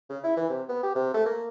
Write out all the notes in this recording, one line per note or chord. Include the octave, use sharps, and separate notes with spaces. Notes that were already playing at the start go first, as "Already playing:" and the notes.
C#3
E4
E3
C3
B3
G4
C3
A3
A#3